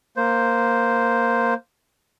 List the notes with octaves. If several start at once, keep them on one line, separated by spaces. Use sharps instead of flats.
A#3 C5